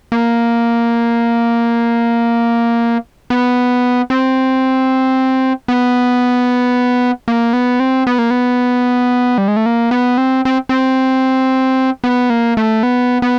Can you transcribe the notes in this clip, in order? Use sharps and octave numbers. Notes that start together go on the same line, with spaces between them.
A#3
B3
C4
B3
A#3
B3
C4
B3
A#3
B3
G3
G#3
A3
A#3
B3
C4
C4
C4
B3
A#3
A3
B3
B3